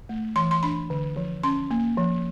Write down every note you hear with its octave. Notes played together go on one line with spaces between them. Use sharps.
A3
E3 C6
C6
D4 B5
D3
F3
C#4 C6
A#3
F3